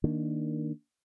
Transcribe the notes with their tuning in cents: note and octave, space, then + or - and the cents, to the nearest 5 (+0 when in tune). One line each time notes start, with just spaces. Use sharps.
D#3 +5 A#3 +0 D4 +0